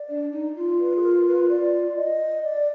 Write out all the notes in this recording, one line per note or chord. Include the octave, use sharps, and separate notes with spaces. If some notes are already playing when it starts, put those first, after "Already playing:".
Already playing: D5
D4
D#4
F4
B4
G#4
A#4
B4
D5
D#5
D5